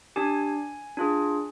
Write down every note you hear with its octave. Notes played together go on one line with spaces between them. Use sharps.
D4 G4 G#5
D4 F4 G#4